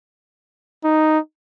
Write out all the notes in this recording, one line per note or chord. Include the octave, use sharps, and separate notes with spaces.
D#4